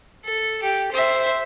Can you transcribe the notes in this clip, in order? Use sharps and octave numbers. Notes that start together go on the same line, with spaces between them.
A4
G4
C5 E5